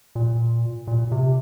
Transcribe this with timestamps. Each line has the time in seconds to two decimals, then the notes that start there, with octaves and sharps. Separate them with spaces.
0.15 A#2
0.87 A#2
1.12 C3